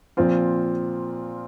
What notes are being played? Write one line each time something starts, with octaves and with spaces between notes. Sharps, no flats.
A#2 F3 C4 F4